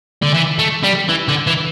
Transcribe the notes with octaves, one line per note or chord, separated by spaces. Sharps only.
D3
E3
A3
G3
E3
D3
E3